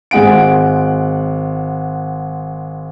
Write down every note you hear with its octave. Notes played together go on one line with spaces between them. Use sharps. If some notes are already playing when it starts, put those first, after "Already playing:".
G#1 G#3 F#5 D7